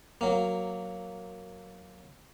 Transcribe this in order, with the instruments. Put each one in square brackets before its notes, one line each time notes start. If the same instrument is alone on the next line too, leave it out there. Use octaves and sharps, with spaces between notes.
[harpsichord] F#3 A#3